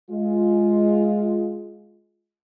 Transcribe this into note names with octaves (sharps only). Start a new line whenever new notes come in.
G#3 F4